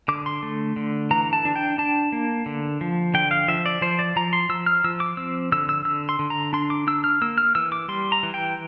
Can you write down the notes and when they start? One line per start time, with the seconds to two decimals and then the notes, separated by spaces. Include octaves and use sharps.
0.08 D3 D6
0.26 C6
0.43 A3
0.76 D3
1.11 E3 A#5
1.33 A5
1.45 D4
1.56 G5
1.78 D4 A5
2.12 A#3
2.46 D3
2.81 F3
3.14 D3 G5
3.31 F5
3.48 F3 E5
3.66 D5
3.81 F3 C5
3.99 D5
4.16 F3 A#5
4.33 C6
4.49 F3 E6
4.66 F6
4.84 F3 E6
5.00 D6
5.17 C4 E6
5.52 D3 E6
5.69 E6
5.85 D3 E6
6.09 C6
6.19 D3
6.30 A#5
6.53 D4 C6
6.70 D6
6.87 D4 E6
7.04 F6
7.22 A#3 E6
7.38 F6
7.55 E3 E6
7.72 D6
7.88 G3 C6
8.12 A#5
8.23 E3
8.34 G5